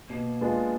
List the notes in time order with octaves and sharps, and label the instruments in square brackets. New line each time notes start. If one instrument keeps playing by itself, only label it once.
[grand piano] B2 [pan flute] A#3
[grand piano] G#3 B3 D4 F4